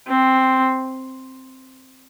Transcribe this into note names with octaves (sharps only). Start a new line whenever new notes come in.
C4